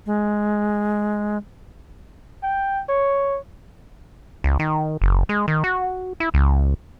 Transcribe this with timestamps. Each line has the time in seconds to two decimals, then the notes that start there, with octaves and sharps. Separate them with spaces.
0.06 G#3
2.43 G5
2.89 C#5
4.44 C#2
4.59 D#3
5.02 F#1
5.29 G#3
5.48 D#3
5.64 F#4
6.20 E4
6.34 C#2